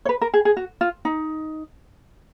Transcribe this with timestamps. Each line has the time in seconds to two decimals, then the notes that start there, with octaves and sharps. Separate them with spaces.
0.05 C#5
0.09 B4
0.21 A#4
0.34 G#4
0.45 G#4
0.57 F#4
0.81 F4
1.05 D#4